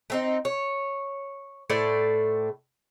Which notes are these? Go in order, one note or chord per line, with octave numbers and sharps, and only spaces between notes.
A3 C4 D#4
C#5
A2 A3 C5 D5